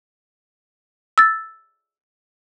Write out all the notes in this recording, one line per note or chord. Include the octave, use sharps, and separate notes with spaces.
E6 A6